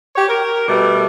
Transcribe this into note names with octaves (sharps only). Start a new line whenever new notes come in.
G4 C#5
A#4
B2 G3 A3